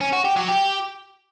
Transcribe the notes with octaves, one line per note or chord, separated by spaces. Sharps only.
C#4
F#4
G4
F#3
G4